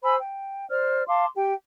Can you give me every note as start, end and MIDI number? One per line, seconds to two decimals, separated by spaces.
0.04 0.16 72
0.04 0.16 80
0.04 0.16 83
0.04 0.16 88
0.19 0.67 79
0.69 1.04 72
0.69 1.04 74
0.69 1.04 89
1.07 1.27 77
1.07 1.27 81
1.07 1.27 84
1.07 1.27 86
1.36 1.54 67
1.36 1.54 79